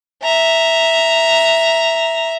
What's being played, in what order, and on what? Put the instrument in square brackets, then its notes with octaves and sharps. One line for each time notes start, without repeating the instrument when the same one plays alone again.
[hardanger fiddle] E5 A#5